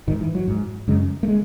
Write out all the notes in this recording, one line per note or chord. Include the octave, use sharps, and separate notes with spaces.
G#2 D#3
E3
F#3
G#2
F#2 C#3 G#3
A3
G#3